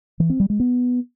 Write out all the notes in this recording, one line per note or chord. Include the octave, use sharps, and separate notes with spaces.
E3
C4
G3
G#3
B3